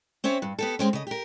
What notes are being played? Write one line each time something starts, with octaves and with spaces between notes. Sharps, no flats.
C4 C#4 C#5 E5
G2
B3 G4 A4
G#3 C4 C#4
C#3 D#5
G4 A#4